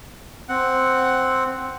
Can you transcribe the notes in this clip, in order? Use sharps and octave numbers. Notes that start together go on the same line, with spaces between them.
C4 F#5